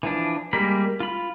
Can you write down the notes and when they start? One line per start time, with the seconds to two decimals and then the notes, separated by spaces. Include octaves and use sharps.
0.03 E3 F3 D4
0.53 G3 G#3 A#3 A#4 B5
1.00 F4 B5